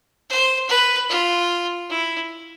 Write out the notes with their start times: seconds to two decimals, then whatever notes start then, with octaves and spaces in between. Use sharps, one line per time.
0.29 C5
0.69 B4
1.10 F4
1.89 E4